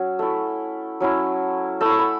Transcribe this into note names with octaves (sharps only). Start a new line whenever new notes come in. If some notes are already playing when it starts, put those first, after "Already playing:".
Already playing: F#3 C#4
A3 E4
F#3 C#4 E4
A3 E4 E6
C#6
B5